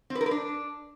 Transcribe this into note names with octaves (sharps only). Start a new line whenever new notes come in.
C4
B4
A#4
B4
D4